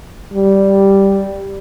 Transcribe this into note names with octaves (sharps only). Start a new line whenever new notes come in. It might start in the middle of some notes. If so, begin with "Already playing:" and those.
G3